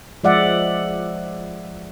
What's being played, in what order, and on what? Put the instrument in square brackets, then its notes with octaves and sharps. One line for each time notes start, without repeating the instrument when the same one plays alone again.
[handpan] F3 G#3 D5 E5 F#5